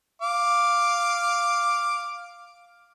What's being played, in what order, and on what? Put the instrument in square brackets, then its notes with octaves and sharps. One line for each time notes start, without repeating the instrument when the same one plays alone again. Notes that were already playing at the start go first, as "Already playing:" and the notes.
[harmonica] F5 D6